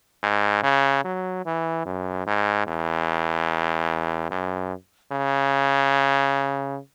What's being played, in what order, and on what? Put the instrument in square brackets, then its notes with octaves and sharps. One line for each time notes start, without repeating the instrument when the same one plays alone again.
[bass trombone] G#2
C#3
F#3
E3
F#2
G#2
E2
F#2
C#3